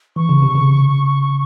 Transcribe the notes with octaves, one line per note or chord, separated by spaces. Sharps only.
E3 C#6
C#3
C3
C#3